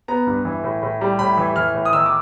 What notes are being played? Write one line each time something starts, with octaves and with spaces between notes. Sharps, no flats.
B3 A#5
G2
E3
A2
A2
G3
A2 B5
E3
E3 F6
A2
D#6
D#3 E6
D6